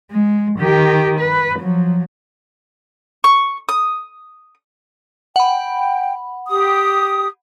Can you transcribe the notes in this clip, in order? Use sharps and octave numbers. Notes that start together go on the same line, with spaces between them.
G#3
D#3 G4
B4
F3 F#3
C#6
D#6
F#5 G5 B5
G4 D#6